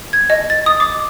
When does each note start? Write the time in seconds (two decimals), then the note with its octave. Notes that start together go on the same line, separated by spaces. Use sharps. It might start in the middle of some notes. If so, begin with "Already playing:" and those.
0.13 G#6
0.30 D#5
0.50 A6
0.66 D#6
0.80 D6